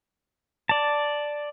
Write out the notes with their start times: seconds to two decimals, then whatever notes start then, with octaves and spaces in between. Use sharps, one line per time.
0.69 D5 A5